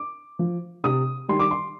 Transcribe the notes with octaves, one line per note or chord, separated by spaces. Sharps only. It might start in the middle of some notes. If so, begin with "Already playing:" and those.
Already playing: D6
F3
C3 D#6
D#3 G3 C6
D6
C6